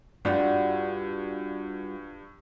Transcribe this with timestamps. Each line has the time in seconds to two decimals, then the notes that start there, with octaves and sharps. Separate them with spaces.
0.25 G2 G3 F4 F#4 D5 F#5